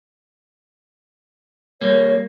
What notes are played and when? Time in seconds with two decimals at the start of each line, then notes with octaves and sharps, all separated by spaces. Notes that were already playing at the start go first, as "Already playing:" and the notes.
1.81 G3 A#3 C#5